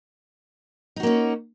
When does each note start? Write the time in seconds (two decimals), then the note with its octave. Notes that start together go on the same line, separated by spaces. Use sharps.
0.96 D#4
1.00 F#4
1.03 A#3
1.07 C#4